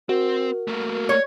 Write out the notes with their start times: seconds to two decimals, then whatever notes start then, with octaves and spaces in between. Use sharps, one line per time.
0.09 C4 F#4 A#4
0.68 A3 A#3
1.09 C#5